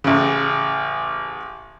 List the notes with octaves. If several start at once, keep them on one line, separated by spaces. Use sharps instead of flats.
A1 C#3